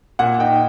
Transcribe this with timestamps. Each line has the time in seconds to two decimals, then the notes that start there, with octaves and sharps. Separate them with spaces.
0.19 A#2 F#5
0.40 D#4 G5